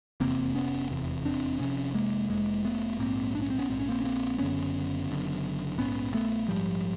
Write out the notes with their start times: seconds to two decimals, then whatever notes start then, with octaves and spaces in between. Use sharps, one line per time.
0.20 F1 E2 C3 A#3 C4
0.55 B3 C#4
0.90 F1 E2 C3
1.25 C4 D4
1.60 F1 F2 C3 B3 C#4
1.94 G#3 A#3
2.30 F1 F2 C3 G#3 A#3
2.65 A3 B3
2.99 A#1 G#2 A#3 C4
3.35 D4
3.42 C#4
3.50 C4
3.58 B3 C#4
3.69 A#1 G#2 C4
3.79 C#4
3.89 A#3 C4
4.00 C#4
4.04 A#3 C4
4.39 F#1 F#2 D3 B3 C#4
5.09 F#1 F#2 D3
5.78 A#1 G#2 B3 C#4
6.14 A3 B3
6.48 A#1 G#2 F3 G3